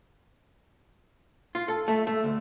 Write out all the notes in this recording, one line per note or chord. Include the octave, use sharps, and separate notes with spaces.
F4
A4
A3
A3
D2